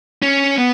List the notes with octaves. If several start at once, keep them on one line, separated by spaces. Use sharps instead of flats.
C#4
B3